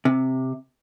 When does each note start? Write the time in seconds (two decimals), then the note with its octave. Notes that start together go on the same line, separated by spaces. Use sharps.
0.05 C3